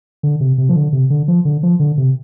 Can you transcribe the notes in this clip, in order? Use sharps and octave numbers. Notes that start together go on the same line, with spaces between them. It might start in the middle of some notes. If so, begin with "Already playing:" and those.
D3
C3
C3
F3
D3
C3
D3
F3
D3
F3
D3
C3